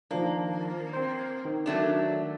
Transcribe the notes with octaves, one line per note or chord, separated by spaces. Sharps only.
D#3 F3 A#3 D4
C4 C5
D#3
F#3 A3 D4